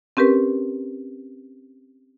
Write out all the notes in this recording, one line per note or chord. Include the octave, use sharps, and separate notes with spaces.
C4 C#4 G4 A#4 B4